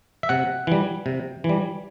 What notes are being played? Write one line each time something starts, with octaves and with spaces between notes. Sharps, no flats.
E5
C3 F#5
E3 G3
C3
E3
G3